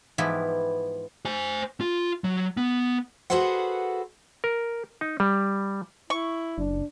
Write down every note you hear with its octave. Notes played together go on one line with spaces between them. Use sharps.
G#2 E3 F3 B3 E4 G4
C5 G#5
F4
F#3
B3
F#4 G#4 A4 B4 C5 F#5
A#4
D#4
G3
E4 C#6
F#1 D4